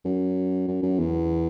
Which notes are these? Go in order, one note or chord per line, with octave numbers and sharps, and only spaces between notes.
F#2
F#2
F#2
E2